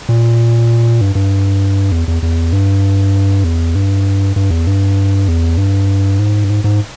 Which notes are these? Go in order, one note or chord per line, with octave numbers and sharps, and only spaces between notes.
A#2
G2
G2
E2
E2
E2
G2
E2
G2
G2
E2
G2
E2
G2
G#2
G2
G#2
G#2